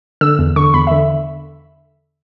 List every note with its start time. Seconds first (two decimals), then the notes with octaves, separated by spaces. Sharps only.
0.21 D3 E6
0.39 E2
0.56 D3 C#6
0.74 E2 B5
0.87 D3 E5